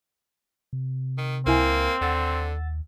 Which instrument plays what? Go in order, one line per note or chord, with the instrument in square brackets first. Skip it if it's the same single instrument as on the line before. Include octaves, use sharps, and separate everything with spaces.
[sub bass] C3
[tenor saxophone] D#3
[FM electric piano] C#2 E4 G#5 [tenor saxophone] A#3 [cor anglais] C4
[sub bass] D#2 [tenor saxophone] D3 [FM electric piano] F#5 E6 A6